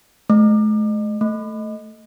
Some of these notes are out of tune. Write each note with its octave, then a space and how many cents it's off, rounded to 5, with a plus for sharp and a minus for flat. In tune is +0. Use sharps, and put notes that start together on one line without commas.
A3 -45
A3 +0